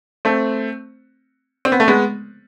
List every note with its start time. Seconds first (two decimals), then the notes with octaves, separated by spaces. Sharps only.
0.25 A3 C4
1.65 C4
1.72 B3
1.80 A3
1.88 G#3 B3